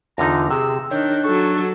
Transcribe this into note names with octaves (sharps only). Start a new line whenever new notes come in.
E2 D3 D#4 F4 A#5
C3 G#4 E6
D#3 D4 C#5 G5
F#3 A4 C#6